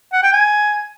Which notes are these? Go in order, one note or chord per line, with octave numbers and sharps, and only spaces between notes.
F#5
G5
G#5